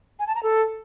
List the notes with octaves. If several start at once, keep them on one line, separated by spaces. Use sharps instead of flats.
G#5
A5
A#5
A4